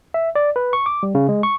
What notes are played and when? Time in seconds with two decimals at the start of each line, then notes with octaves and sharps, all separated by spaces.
0.14 E5
0.35 D5
0.56 B4
0.73 C#6
0.86 D6
1.03 G3
1.15 C#3
1.29 G#3
1.43 C#6